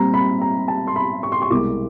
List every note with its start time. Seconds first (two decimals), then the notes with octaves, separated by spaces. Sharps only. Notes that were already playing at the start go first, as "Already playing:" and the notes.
Already playing: A#2 G3 C4 A#5
0.14 B5
0.41 A#5
0.68 A5
0.87 C6
0.96 B5
1.23 C#6
1.32 C6
1.42 C#6
1.51 C2 B2 G#3 C4 D6